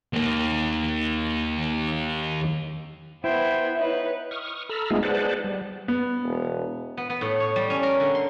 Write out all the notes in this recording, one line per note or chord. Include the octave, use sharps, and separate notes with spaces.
D#2 A#3
B3 E4 C5 G5 G#6
D#4 B4 C#5
C#6 D#6 F6
A4 A#5 B5 E6 F6
G#3 A3 B3 D#4 F4 G#4
G#4 B4 C5 D5 F#5 A5
G3
B3
E1
B3
B3
A2
C#5
G3
C#4
A#4
D3
C6